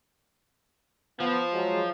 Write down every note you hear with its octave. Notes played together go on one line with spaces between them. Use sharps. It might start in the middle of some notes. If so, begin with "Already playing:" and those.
F3 B3
F#3 G#3